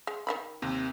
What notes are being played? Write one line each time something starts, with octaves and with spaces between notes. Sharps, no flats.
G#3
D#3 E3 B5
D#2 C3 C4